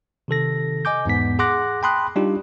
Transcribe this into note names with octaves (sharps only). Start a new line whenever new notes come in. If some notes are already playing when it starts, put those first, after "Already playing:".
C3 D#3 A4 A#6
D#5 G#5 D6 G6
E2 G#2 B3 B6
G#4 F#5 C6 D6 F#6 A#6
G5 A5 B5 C6 D#6 F#6
G3 D4 D#4 F4 G4